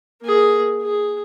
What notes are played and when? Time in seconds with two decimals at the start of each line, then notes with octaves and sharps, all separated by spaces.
0.22 A#3 G#4
0.82 G#4